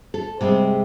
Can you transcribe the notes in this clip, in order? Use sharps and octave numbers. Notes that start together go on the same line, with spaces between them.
A4
C3 G3 G#3 C4